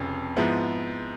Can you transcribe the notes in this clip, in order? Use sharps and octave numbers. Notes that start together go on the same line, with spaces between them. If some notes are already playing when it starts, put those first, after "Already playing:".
Already playing: F1 F2 C#3
G#2 F3 G#3 B3 E4